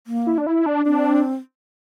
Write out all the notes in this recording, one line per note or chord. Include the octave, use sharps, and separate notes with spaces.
A#3
E4
D4
E4
D4
C4 D4